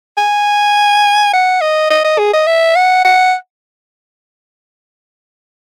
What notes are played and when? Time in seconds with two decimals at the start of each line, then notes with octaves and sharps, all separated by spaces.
0.18 G#5
1.33 F#5
1.61 D#5
1.90 D#5
2.04 D#5
2.18 G#4
2.34 D#5
2.47 E5
2.76 F#5
3.05 F#5